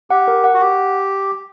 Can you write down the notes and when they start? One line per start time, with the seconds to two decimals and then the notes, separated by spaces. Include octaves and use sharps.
0.10 G4 F#5
0.28 A#4
0.44 F#5
0.54 F#4
0.60 G4 F#5